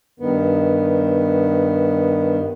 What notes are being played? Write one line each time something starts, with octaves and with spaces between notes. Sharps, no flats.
G2 D#3 B3